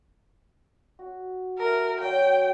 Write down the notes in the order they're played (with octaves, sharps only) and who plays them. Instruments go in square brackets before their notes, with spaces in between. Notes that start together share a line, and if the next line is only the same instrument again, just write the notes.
[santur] F#4
[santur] A3 E4 [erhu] A#4
[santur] F#3 D5 C#6 [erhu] G5